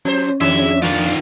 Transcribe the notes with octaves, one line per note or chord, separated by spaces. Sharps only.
F3 C#4 C5
F2 D#3 F#3 G#3 D4 E5
D#3 E3 F4